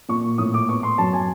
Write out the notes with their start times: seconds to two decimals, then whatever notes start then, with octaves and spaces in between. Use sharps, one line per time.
0.09 A#2 C#6
0.38 A2 D#6
0.54 D6
0.69 B3 C#6
0.83 C6
0.98 F#2 A5
1.13 G#5